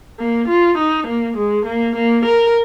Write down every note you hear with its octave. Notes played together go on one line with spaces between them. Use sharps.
A#3
F4
D#4
A#3
G#3
A#3
A#3
A#4